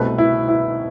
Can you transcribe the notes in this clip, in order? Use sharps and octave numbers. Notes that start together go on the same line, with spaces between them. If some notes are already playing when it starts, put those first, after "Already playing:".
Already playing: C2 B2 A3 C4 B4
E4
E4